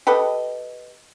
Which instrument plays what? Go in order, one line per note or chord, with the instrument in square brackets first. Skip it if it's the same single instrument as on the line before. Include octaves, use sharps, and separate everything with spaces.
[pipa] G4 A4 B4 D#5